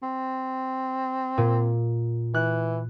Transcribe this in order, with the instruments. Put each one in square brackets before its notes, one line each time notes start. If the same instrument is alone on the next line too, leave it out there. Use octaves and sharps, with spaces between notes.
[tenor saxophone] C4
[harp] A#2
[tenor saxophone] E3 [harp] F#6